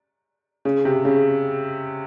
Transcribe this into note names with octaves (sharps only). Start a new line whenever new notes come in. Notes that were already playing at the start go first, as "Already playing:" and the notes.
C#3
C3
C#3